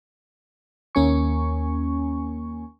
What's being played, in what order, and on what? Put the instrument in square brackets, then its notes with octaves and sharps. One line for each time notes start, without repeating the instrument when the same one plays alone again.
[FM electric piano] D#2 A#3 C#4 G#5 C#6